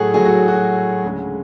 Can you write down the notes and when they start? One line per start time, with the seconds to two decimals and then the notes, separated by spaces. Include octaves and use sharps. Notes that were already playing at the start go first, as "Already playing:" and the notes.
Already playing: A2 F#3 A3 F#4 G#4 A4
0.14 A2 F#3 A3 G#4
0.25 F#4
0.48 F#4
1.04 D2 C#3 G#3